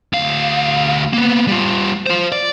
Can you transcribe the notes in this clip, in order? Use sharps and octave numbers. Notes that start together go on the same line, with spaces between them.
D2 F5
A#3 B3
G3 F4
F4 C5
D5